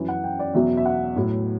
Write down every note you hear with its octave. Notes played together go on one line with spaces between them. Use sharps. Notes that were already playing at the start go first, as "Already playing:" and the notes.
Already playing: F#2 E3
F#5
G5
D5
E2 B2 F#3 E5
E5
F#5
A2 F#3